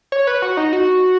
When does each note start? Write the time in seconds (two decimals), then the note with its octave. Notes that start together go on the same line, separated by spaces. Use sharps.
0.12 C#5
0.27 B4
0.42 F#4
0.57 D#4
0.73 F#4